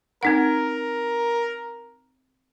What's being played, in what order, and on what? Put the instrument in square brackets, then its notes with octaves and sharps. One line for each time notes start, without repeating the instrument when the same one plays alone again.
[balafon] C4 D#4 F#5 [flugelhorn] A#4